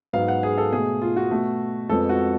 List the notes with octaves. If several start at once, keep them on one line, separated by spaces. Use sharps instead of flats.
G#2 F#3 B3 F5
F#5
G#4
A4
B2 A3 G#4
F4
F#4
B2 A3
F2 F3 G#3 B3 A4
F#4